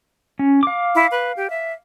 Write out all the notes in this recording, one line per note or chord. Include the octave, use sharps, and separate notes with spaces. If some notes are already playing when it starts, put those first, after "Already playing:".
C#4
F5 D6
E4
B4
G4
E5